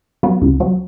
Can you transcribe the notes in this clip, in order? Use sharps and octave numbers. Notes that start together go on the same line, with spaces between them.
F#3 B3
C#2
F#3